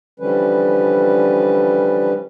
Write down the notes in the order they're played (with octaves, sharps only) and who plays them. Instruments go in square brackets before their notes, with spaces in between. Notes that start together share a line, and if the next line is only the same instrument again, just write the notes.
[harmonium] D3 E3 F3 G3 C#4 B4